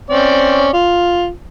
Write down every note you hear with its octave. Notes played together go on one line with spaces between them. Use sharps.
C4 C#4 D5
F4